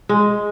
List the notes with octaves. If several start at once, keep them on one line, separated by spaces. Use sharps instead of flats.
G#3